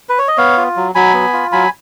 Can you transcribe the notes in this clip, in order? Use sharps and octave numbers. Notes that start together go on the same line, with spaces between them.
B4
C#5
D#5
B3 C#5 F5
F4
F#3
F#3 G#5 B5
B3
F4
F#3 G#5 B5